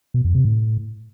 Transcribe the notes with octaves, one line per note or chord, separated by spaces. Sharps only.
B2
F2
C3
A2